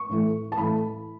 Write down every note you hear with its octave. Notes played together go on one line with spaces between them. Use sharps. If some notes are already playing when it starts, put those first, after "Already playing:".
Already playing: C#6
A2 E3 A3
A5
A2 E3 A3 B5